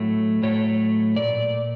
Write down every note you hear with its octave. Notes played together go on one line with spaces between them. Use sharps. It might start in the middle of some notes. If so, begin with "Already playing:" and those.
Already playing: A2 F#3 A3
A2 F#3 A3 C#5
A#2 D5